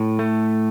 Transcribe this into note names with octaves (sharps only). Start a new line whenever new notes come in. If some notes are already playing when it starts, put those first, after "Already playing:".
Already playing: A2
A3